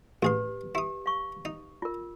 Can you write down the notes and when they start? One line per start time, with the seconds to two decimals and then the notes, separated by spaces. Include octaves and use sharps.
0.23 A1 G4 G#4 B4 C6
0.75 E4 G4 D#6
1.06 F5 C#6
1.45 D#4
1.82 F4 A#4